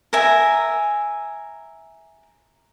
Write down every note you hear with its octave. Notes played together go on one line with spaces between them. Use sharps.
A#4 E5 G#5